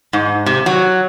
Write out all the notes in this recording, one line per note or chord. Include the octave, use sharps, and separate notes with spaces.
G#2
C3
F#3